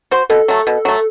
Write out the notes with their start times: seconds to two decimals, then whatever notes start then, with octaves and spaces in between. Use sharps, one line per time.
0.11 F#4 C5
0.29 B2 A4
0.48 F#3 A3
0.67 B2
0.85 F#3 A3